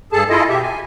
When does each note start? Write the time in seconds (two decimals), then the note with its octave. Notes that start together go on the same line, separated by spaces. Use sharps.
0.12 G2 G#4 A4 A5
0.29 E4 F4 G#4 A4 D#5
0.49 B2 G4 E5
0.62 G#5